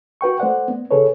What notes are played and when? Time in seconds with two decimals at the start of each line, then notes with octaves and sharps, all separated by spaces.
0.21 F#4 B4 G5 C#6
0.40 A3 C5 D5 F#5
0.68 B3
0.91 C#3 G#4 A4 B4 C#5